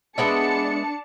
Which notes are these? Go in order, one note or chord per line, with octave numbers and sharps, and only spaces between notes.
G#3 B3 D4 E5 A5 C#7